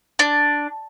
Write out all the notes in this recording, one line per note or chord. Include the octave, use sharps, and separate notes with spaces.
D4